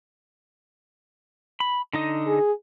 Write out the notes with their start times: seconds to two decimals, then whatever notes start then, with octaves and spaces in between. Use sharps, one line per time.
1.60 B5
1.93 D3 D#4 D#5
2.27 G#4